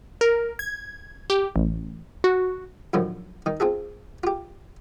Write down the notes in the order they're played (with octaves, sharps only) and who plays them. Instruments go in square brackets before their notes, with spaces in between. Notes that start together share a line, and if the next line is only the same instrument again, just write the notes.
[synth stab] A#4
G#6
G4
A1
F#4
[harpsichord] F#2 A2 D3 D#3 F3
D#3 D#4
C4 F4 G#4 A4
F4 G4